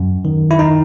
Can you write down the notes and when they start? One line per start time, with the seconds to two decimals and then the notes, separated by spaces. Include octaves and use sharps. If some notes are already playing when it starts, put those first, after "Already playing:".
Already playing: F#2
0.25 D#3
0.51 E4
0.59 D#4